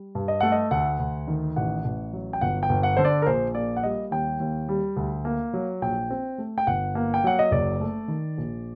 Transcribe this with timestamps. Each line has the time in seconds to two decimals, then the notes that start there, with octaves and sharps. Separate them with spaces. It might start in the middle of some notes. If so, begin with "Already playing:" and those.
Already playing: G3
0.15 G2
0.28 D#5
0.41 A3 F#5
0.52 D#5
0.71 D2 F#5
0.99 D2
1.28 D#3
1.56 A1 F#5
1.85 A1
2.13 F#3
2.33 G5
2.41 G1 F#5
2.63 G5
2.69 G1
2.83 F#5
2.97 D3 C5
3.05 D5
3.22 A#4
3.27 A#1 C5
3.54 A#3 D5
3.77 F#5
3.83 G3 D#5
4.11 D#2 G5
4.40 D#2
4.69 G3
4.96 D2
5.25 A#3
5.53 F#3
5.82 A#1 G5
6.10 C4
6.38 A3
6.58 G5
6.67 G1 F#5
6.95 A#3
7.14 G5
7.24 F#3 F#5
7.39 D#5
7.51 F#1 D5
7.80 A3
8.08 D#3
8.38 A#1